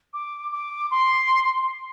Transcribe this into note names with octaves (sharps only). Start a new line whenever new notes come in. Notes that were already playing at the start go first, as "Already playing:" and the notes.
D6
D6
C6